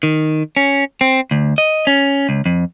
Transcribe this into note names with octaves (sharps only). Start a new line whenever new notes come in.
D#3
C#4
C4
D2
D#5
C#4
C#2
F2